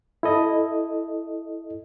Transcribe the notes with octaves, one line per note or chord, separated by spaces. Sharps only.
E4 A4 D#5